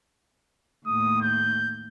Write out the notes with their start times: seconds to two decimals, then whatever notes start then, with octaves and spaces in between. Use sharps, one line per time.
0.86 D#2 A2 D#6
1.21 G6